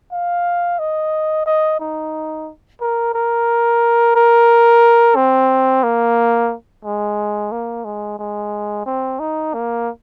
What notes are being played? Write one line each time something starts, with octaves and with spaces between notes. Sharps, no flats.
F5
D#5
D#5
D#4
A#4
A#4
A#4
C4
A#3
G#3
A#3
G#3
G#3
C4
D#4
A#3